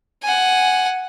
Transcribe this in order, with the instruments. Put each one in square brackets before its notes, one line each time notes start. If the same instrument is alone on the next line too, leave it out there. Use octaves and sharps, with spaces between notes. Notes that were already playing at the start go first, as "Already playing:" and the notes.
[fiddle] F#5 G#5